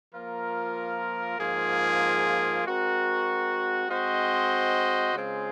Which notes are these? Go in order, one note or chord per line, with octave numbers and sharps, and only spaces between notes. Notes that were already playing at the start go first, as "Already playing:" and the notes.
F3 A#3 F4 A#4
G#2 F3 A#3 F4 G#4
G#3 C4 F#4 A#4
G#3 C4 F#4 C5 D#5
C#3 G#3 C4 F4 G#4